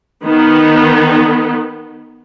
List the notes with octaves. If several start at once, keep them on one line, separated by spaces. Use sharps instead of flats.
D#3 B3